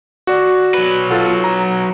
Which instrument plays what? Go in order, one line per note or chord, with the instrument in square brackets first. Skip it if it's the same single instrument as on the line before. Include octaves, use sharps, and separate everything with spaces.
[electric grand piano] F#4 D5
[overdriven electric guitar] F#3 B4
[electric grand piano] F4 A4 F#5
A#5